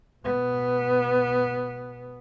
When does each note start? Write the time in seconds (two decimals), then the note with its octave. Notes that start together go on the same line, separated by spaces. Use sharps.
0.25 B2 B3